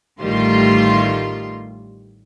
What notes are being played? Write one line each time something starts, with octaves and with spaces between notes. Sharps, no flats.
A1 D#3 G3 A3 F4 C6